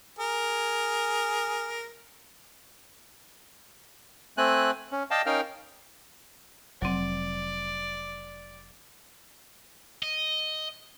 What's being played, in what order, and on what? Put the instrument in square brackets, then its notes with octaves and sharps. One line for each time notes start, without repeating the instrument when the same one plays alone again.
[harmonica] G#4 A#4
[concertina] A3 C4 G#5 F#6
C#4
D5 D#5 F5 G5 A5
C#4 D#4 A#4 F5 G5 F6
[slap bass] F1 [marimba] F#3 C4 [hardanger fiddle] D5
[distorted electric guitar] D#5